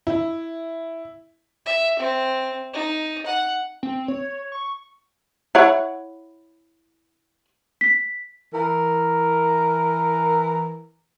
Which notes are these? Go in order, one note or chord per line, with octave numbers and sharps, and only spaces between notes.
E4
E5
C4
D#4
F#5
C4
C#5
C#6
E4 C#5 F#5
B6
E3 A#4